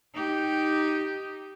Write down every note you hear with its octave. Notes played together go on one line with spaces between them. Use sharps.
D#4 G4